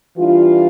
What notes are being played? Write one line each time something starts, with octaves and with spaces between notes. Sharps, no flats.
E3 G3 D4 F4